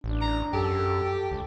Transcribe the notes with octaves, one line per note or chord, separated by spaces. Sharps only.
A1 D4
A#5
F#2 G4 A4
C#2